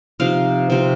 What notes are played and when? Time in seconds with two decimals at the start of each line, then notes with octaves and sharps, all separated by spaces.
0.20 C3 F3 D#4 F5
0.70 C3 F3 C4